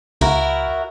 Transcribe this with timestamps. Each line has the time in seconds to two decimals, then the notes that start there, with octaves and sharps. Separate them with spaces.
0.21 C#2 E4 F#4 A#4